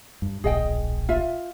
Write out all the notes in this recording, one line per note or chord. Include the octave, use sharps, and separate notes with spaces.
G2
D1 A#1 G#4 D#5 G5
F4 E5